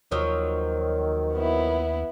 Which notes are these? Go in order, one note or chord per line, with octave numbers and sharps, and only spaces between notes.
D#2 D#3 F3 F#3
B3 E4